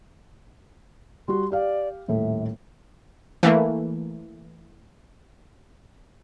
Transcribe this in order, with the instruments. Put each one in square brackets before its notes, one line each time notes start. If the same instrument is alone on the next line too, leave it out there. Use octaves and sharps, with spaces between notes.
[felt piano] G3 F#4 [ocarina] C6
[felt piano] G4 F5 [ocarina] D5
[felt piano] D#1 A2 A4 [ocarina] E5
[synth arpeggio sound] E3 A3 A#3